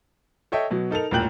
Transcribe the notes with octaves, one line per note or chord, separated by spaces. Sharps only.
A4 C#5 D#5 E5 G5
B2 F#3
D#4 A4 A#4 F7
E1 A1 A#2 G5 F#6 F#7